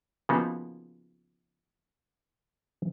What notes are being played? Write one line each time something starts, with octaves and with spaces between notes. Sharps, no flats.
C#3 F3 A#3 B3 D#4 F#4